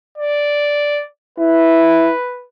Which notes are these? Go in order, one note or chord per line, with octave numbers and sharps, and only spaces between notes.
D5
E4 B4